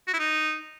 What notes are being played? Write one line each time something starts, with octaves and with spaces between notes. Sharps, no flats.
F#4
E4
D#4